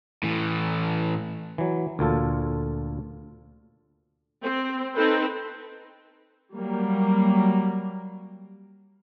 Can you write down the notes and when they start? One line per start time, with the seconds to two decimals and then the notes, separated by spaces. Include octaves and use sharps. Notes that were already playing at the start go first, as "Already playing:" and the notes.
0.23 A2 E3
1.58 E3 F#3
1.99 D2 A#2 F4 A4
4.43 C4
4.95 C4 D#4 A4 B4 C5
6.56 F#3 G3 A#3